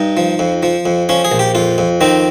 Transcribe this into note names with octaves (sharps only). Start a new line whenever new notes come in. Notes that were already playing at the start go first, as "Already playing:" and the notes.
Already playing: G2 D#4
F3
F2
F3
F2
F3 C#4
G#4
A#1
G4
F2 F4
F2
D#3 C4